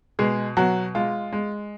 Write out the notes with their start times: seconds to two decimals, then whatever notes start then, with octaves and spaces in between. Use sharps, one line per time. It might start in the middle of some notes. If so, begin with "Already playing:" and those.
0.19 B2 G#3 G#4
0.57 B2 F#3 F#4
0.95 G#3 F4
1.32 G#3